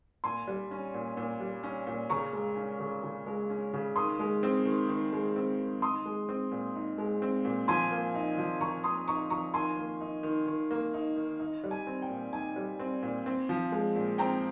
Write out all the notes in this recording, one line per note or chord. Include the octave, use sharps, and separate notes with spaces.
A#2 G#5 C6
G3
C#4
A#2
A#2
G3
C#4
A#2
C#3 A#5 C#6
G#3
C#4
C#3
C#3
G#3
C#4
C#3
D#3 C6 D#6
G#3
C4
D#3
D#3
G#3
C4
D#3
D#4 C6 D#6
G#3
C4
A#2
D#4
G#3
C4
A#2
F3 G#5 C6
A#3
D#4
F3
F3 A#5 C#6
A#3 C6 D#6
D#4 A#5 C#6
F3 A#5 C#6
D#3 G#5 C6
A#3
D#4
D#3
D#3
A#3
D#4
D#3
D#4
G3
G#5
C4
G5
A#2
D#4 G#5
G3
C4
A#2
C4
F3
G#3
A#2
C4 G5 A#5